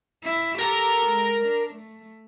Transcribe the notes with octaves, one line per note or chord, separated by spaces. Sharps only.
E4
G4 A4 A#4 A#5
G#3
D4
A3